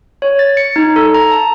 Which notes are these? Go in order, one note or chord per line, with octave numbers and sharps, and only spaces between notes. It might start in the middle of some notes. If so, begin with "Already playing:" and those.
C#5
A6
C#7
D#4
A4
A#5
A5